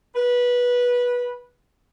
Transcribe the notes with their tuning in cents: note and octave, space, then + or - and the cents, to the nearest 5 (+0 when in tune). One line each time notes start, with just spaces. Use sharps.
B4 -15